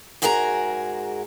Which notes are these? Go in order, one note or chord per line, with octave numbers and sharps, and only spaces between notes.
G#2 F#4 G#4 A#4 G#5 A#5